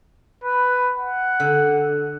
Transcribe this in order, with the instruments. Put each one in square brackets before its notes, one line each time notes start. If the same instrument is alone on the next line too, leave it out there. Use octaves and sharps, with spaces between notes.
[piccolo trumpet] B4
F#5
[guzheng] D3